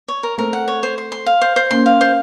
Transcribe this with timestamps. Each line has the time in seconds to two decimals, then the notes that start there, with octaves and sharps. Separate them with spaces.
0.08 C#5
0.23 A#4
0.38 A3 C4 A#4
0.53 F#5
0.68 C#5
0.83 C5
0.98 C5
1.12 C6
1.26 F5
1.41 C5
1.56 C5
1.71 A#3 C#4 C6
1.86 F5
2.01 C5